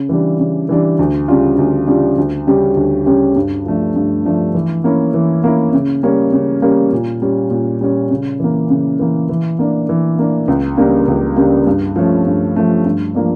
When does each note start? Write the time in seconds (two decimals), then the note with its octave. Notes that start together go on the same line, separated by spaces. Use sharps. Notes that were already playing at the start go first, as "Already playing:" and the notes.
Already playing: C#3
0.09 E3 G3 D4
0.39 C#3
0.69 E3 G3 D4
0.99 D2
1.28 C#3 G3 D4 F4
1.58 D2
1.87 C#3 G3 D4 F4
2.18 D2
2.47 C#3 G3 C#4 G4
2.77 D2
3.06 C#3 G3 C#4 G4
3.36 G2
3.66 F3 A3 D4
3.96 G2
4.25 F3 A3 D4
4.54 E3
4.84 A#3 C#4 E4
5.14 E3
5.44 A#3 C#4 E4
5.73 C#3
6.03 G3 A#3 C#4
6.33 C#3
6.62 G3 A#3 C#4
6.92 A#2
7.22 G3 C#4
7.51 A#2
7.81 G3 C#4
8.11 C#3
8.40 E3 A#3
8.70 C#3
8.99 E3 A#3
9.29 E3
9.59 A#3 D4
9.89 E3
10.19 A#3 D4
10.48 C#2
10.77 C#3 G3 A#3 D4
11.08 C#2
11.36 C#3 G3 A#3 D4
11.67 G2
11.96 F3 A3 C#4
12.26 G2
12.56 F3 A3 C#4
12.85 G2
13.15 F3 A#3 D4